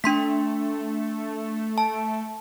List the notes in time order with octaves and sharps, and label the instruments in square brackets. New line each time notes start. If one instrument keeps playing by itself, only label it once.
[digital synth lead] A3 [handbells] D4 C6 B6
[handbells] A5